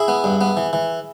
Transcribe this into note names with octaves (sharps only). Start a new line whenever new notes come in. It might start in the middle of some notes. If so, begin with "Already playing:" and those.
Already playing: E4 G#4
B3
G2
B3
E3
E3